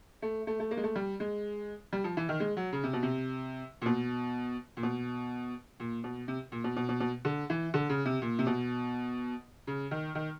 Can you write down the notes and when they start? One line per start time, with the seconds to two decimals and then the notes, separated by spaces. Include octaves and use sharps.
0.22 A3
0.47 A3
0.60 A3
0.71 A#3
0.77 G#3
0.84 A3
0.96 G3
1.20 G#3
1.93 G3
2.04 F3
2.17 E3
2.29 D#3
2.40 G#3
2.57 F#3
2.73 C#3
2.84 C3
2.93 B2
3.03 C3
3.82 A#2
3.86 B2
4.77 A#2
4.83 B2
5.80 A#2
6.04 B2
6.28 C3
6.52 A#2
6.64 B2
6.77 B2
6.89 B2
7.00 B2
7.25 D3
7.50 E3
7.74 D3
7.89 C#3
8.05 C3
8.22 A#2
8.39 C3
8.47 B2
9.67 C#3
9.91 D#3
10.15 D#3